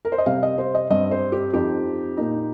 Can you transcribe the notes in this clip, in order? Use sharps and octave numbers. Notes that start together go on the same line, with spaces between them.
A#4
C5
D#5
C3 G3 C4 F5
D#5
C5
D#5
G2 G3 C4 D#5
C5
G4
F2 F3 D#4 G4
A#2 A#3 D#4